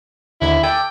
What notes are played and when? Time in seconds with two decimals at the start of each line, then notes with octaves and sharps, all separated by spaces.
0.41 D#2 D3 E4 G#6
0.63 A4 D5 G5 G#5